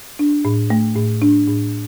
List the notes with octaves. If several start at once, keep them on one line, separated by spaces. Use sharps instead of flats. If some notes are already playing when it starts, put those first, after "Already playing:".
D4
A2
A3
A2
D4
A2